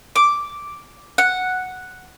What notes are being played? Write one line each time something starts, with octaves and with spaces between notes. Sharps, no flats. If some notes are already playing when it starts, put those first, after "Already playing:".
D6
F#5